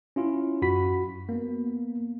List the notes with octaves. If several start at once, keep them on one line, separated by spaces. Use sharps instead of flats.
C#4 E4 F4
F#2 F#4 B5 B6
A#3 B3